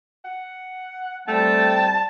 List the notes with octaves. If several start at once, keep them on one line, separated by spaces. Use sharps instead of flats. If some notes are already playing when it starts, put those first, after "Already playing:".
F#5
G3 A3 C4 G5 A5